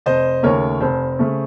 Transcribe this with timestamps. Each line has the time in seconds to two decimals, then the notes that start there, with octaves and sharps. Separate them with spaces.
0.06 F1 C5 D#5
0.43 D#2 C#3 A3 A#4 C#5
0.80 F1 C5
1.19 C#3 A3